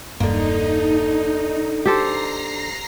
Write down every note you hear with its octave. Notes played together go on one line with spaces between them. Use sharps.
E1 G2 D3 A#3 D#4
G4 A4 C5 A#5 A#6 C7